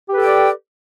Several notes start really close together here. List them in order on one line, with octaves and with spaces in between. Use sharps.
G4 B4 A4 G5 D5